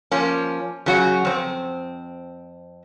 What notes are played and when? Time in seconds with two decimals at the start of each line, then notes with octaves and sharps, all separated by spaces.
0.11 F3 A#3 C#4
0.86 C#3 F#3 F#4
1.25 F2 C4